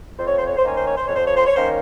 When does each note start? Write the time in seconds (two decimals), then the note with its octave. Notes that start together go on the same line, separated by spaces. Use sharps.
0.18 F2 C5
0.27 C#5
0.38 C5
0.47 C#5
0.57 C5
0.63 D#3 A#3 C#4 C#5
0.77 C5
0.87 C#5
0.97 C5
1.07 F2 C#5
1.16 C5
1.26 C#5
1.35 C5
1.46 C#5
1.54 D#3 A#3 C#4 C5